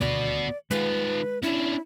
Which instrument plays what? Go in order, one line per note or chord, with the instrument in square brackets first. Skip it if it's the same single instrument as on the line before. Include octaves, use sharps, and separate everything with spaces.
[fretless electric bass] D#1 D2 B2 [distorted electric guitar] B3 F#4 [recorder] D5
[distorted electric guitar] D#3 F4 [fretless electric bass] G#3 [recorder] B4
[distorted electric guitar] C#4 D4 [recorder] E4